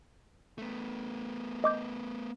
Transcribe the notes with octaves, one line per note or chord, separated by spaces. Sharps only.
A3 B3
D#5 D6 G6